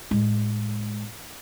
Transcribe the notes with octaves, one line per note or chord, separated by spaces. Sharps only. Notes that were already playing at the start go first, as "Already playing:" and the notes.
A2 G#3